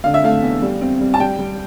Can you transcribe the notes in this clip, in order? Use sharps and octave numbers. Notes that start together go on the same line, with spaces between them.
D3 F5
E5
A3 F5
E2
G3
C4
G3
A5
G3 G5
G3